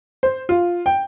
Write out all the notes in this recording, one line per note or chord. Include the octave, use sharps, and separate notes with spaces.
C5
F4
G5